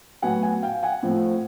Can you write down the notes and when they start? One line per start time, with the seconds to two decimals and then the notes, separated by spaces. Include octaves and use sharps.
0.22 A2 F#3 B3 F#5 G#5
0.42 F#5 G#5
0.63 F5 G5
0.83 F#5 G#5
1.03 A2 F3 A3 C4